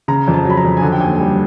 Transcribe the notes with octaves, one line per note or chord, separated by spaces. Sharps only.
C#3 A#5
F2
A5
F#3 B5
A#5
F2
G#5
D3 A5
G5
D#2 G#5
G#5
G3 G5